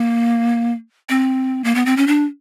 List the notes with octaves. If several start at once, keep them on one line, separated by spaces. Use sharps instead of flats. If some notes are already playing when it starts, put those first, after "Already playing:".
Already playing: A#3
C4
A#3
B3
C4
C#4
D4